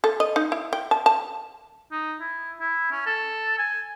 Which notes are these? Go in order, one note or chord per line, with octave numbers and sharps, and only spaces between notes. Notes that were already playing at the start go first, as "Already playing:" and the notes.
A4
D#5
D#4
E4
G5
A5
A5
D#4
E4
E4
C#4
A4
G#5